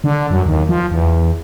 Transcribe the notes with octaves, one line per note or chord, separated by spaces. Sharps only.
D3
F#2
D#2
F3
E2